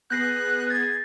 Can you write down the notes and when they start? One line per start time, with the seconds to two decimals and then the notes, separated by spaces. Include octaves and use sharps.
0.10 B3 G#4 F#6 G6 A#6 C7
0.70 G#6 A6